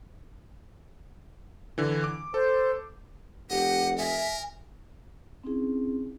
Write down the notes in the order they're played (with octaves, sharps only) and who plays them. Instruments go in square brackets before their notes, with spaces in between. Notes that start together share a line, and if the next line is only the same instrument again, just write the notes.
[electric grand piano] D3 E3
D6
[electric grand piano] A4 [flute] C5
[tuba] F1 [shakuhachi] G4 [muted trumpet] D#5 [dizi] F#5
[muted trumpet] A#4 [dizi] E5 [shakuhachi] G#5
[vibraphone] C4 C#4 D#4 E4 G#4